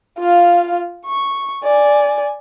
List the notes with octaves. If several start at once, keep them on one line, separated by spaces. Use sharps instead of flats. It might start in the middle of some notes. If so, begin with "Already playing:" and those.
F4 F5
C#6
D5 G#5